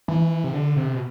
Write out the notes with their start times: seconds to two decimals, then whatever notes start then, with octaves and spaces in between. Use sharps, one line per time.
0.08 E3
0.44 C3
0.53 D3
0.77 C3
0.94 B2